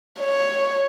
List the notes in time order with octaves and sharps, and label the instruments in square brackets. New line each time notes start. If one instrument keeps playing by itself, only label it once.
[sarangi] C#5